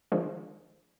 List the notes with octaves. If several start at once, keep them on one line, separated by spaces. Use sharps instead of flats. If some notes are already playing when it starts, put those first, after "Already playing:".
D#3 F3 G#3 D4